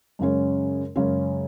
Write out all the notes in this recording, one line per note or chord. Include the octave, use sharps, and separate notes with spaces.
F#2 C#3 G#3 C#4
F#2 C#3 G#3 C#4